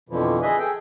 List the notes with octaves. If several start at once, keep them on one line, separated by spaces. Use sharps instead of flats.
F2 B2 D3 E3 F3
G#4 B4 D#5 E5 G#5
G#4 A4 G5